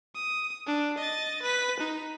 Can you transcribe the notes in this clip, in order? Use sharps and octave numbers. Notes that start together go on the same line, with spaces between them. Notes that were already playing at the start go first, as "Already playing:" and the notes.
D#6
D4
D#5 A6
B4 B6
D#4